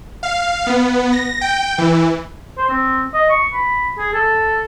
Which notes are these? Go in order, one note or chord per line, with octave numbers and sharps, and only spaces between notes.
F5
B3
A#6
G5
E3
C5
C4
D#5
C#6
B5
G#4
A4